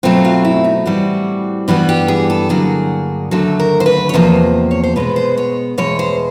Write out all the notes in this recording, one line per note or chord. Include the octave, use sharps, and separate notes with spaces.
B2 F#3 A3 C4 F4
F4
E4
D#4
A2 E3 G3 C4 F#4
G2 E3 G3 B3 F#4
G4
G#4
A4
G2 D3 F#3 A#3 G#4
D#2 D3 F#3 A3 A4
A#4
C5
B4
C#5
E2 C3 F3 A#3 C5
C#5
C5
B2 G#3 B3 B4
C5
C#5
E2 B2 G#3 C#5
C5